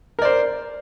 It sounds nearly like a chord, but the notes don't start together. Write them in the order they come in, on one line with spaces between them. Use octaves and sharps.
A#4 D5 C5